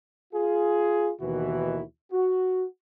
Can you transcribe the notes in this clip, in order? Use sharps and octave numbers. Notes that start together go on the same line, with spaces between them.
F4 G#4
D#2 B2 D#3 E3 E4 F#4
F#4